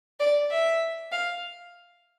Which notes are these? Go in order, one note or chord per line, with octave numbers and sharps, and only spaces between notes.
D5
E5
F5